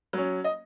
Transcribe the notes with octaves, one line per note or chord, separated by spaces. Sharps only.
F#3 C#4
D#5